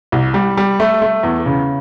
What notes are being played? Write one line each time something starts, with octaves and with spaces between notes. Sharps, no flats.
C2
G3
G3
A3
A3
E2
C#3